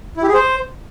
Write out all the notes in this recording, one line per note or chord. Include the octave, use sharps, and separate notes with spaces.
E4
G4
G#4
C5